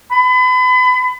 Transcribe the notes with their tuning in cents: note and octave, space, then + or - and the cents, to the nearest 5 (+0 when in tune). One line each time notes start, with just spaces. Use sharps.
B5 +35